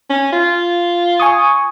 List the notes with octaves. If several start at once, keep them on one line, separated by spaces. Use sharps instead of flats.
C#4
F4
G#5 C#6 D#6